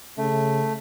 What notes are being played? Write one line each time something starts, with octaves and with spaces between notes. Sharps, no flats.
C#3 A3